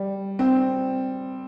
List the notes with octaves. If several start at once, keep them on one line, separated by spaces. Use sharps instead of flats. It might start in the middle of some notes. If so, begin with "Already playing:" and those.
Already playing: G3
C4